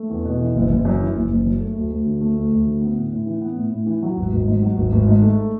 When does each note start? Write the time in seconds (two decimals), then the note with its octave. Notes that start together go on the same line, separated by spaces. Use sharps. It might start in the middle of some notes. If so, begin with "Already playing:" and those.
Already playing: A3
0.10 E2
0.25 B2
0.40 E3
0.55 F#1
0.70 F#1
0.85 F#2
1.00 E3
1.15 F#1
1.30 F#1
1.45 F#2
1.60 A3
1.76 D2
1.90 D2
2.06 D3
2.21 A3
2.35 D2
2.51 D2
2.67 D3
2.81 B3
2.96 A2
3.12 A2
3.26 E3
3.41 B3
3.56 A2
3.71 A2
3.86 E3
4.03 F#3
4.17 G#1
4.32 G#1
4.48 G#2
4.62 F#3
4.77 G#1
4.93 G#1
5.08 G#2
5.22 A3